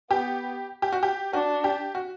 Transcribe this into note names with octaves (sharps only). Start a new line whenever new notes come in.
B3 G4
G4
F#4
G4
D4 F#4
G4
F#4